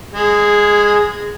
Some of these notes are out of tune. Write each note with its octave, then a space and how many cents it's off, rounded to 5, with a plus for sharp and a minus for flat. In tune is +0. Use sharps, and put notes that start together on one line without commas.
G#3 -20 G#4 +0